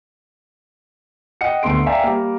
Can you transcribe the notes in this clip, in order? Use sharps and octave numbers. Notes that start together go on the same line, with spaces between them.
D#5 F#5 G5 C#7
D2 A3 B3 C6 D7
D5 E5 F5 G5 G#5 A#5
G3 A#3